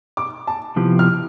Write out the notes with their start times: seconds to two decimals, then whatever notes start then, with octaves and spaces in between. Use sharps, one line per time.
0.17 D6
0.47 A5
0.76 C3 F3 B3 E4 G4
0.99 F6